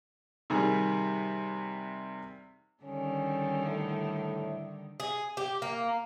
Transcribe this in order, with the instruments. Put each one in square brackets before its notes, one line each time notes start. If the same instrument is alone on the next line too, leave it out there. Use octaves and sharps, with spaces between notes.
[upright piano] C3 D#3 G3 G#4
[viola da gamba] D3 D#3 G3 [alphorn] C#4
[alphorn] A2
[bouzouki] G#4
G4
A#3